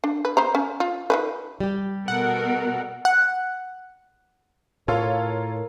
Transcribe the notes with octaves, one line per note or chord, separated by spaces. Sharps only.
D4
B4
B3 C5 A#5
C#4
F4
D#3 B3 B4
G3 G4
B2 A4 A#4 F#5
F#5
A2 F4 A4 A#4 C#5